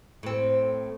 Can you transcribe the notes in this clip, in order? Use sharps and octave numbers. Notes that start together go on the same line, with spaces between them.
A2 C4